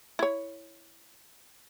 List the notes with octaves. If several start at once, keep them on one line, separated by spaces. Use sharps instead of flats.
E4 C#5